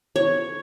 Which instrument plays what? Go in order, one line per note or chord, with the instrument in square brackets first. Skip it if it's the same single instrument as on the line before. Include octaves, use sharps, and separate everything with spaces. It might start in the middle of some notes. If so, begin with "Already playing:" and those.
[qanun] C#5